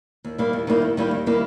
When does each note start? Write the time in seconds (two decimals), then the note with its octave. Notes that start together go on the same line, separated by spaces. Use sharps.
0.24 D#2
0.38 D#3 G3 A#3 E4
0.53 D#2
0.67 D#3 G3 A#3 E4
0.82 D#2
0.97 D#3 G3 A#3 E4
1.11 D#2
1.26 D#3 G3 A#3 E4